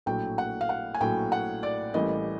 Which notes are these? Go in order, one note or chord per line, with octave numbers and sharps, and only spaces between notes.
A#1 A2 F#3 G5
F#5
F5
F#5
G#5
A#1 A2 F#3 G5
F#5
D5
A1 A2 E3 G3 A#3 D#5